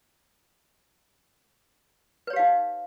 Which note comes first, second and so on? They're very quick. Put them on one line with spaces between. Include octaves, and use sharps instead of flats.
B4 C#5 G4 F5 D#4